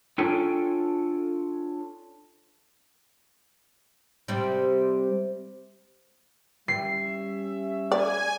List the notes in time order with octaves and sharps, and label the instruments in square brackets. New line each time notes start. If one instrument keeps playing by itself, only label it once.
[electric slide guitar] D4 F4 A4 C#5 G5 G#5
[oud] C3 G3
[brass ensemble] G3 C#4 E5 [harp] C7
[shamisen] D5 [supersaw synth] G#5